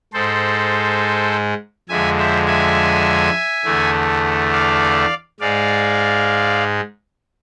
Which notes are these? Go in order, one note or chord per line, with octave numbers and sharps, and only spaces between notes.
G#2 G#3 A4 C5
F2 D3 G#3 E5 G#5
C5 E5
E5 G#5
E2 D3 A3
D5 F5
G#2 G#3 D5 F5